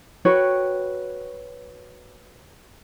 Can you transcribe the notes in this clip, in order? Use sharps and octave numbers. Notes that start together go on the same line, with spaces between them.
F#4 B4 C#5 G5